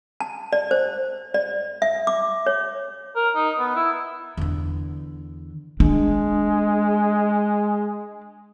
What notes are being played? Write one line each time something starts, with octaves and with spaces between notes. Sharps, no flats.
A5
D5
C5
D5
E5
D6
C#5
A#4
D#4
B3
E4
E2 D3
G#3 D4